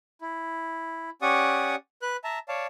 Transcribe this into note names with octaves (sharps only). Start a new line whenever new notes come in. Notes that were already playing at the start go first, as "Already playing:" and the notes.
E4
C#4 G4 D5 F#5 C#6 D#6
B4 F#6
E5 A5 A#5
C#5 D5 F5 A5